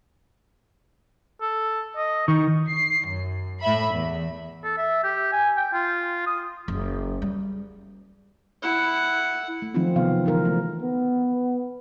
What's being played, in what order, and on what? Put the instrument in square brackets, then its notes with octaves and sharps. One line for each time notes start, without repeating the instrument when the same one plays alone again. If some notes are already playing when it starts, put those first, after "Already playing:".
[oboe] A4
D#5
[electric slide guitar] D#3 [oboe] C#6
[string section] C7
F#2
A2 E5 B5
E2
[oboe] A4
E5
G4
G#5
G5
F4
D#6
[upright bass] F#1
G3
[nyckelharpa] E4 F#5
[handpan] A3
D#3 F3 F#3 C4 D#4 F4
C3 E3 B3 F5
D3 E3 F3 G#3 D#4 A#4
E3 A3
[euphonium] B3